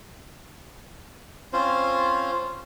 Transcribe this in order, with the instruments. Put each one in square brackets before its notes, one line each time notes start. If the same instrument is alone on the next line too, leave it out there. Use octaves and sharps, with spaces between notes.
[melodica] C4 C#4 F4 C5